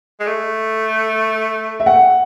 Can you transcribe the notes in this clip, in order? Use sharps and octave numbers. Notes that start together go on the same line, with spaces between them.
G#3
A3
E5
F#5